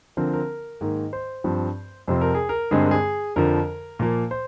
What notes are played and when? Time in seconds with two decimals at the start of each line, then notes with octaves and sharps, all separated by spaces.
0.17 D3 F3 C4 A#4
0.33 A#4
0.81 G#2 D#3 A#3
1.13 C5
1.44 G2 F3 C4
2.08 F2 C3 F3 C4 C5
2.21 A#4
2.35 G#4
2.49 A#4
2.71 G2 D3 G#3 C4 G#4
2.81 A#4
2.91 G#4
3.36 F2 D3 F3 A#4
3.99 A#2 F3 A#3
4.31 C5